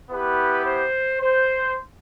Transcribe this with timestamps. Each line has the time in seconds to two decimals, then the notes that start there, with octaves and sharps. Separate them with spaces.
0.10 B3 E4 G4 B4
0.65 C5
1.19 C5